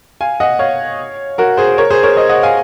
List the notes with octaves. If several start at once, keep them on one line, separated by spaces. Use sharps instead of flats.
F5 G#5
D#5 F#5
C#5 F5
F#4 A#4
G#4 C5
A#4 C#5
G#4 C5
A#4 C#5
C5 D#5
D#5 F#5
F5 G#5